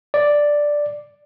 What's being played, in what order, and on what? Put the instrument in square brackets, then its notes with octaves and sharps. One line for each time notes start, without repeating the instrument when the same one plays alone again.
[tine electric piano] D5